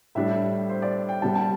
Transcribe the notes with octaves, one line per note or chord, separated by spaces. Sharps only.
A2 G3 D4 E5
C5
D5
G5
C2 C3 G3 A5
A5